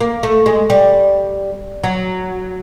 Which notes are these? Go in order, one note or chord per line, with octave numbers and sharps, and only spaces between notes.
A#3
A3
G#3
G3
F#3